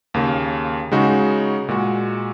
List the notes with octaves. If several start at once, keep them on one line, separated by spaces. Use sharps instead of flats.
D#2 C#3 A#3
C#3 G#3 D#4 F#4
A#2 G#3 F#4